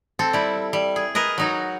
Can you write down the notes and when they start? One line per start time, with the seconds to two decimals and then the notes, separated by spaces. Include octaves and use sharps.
0.19 C4 A4
0.33 G3 E4
0.73 G3
0.96 G#4
1.15 G#4 A#4 B4 D#5
1.38 F#3 D#4 F#4